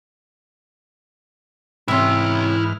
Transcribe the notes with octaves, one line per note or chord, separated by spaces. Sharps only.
G#2 C3 E3 C#4 E4 E5 C6 F6